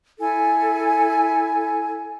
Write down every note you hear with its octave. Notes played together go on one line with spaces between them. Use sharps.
E4 A4 G#5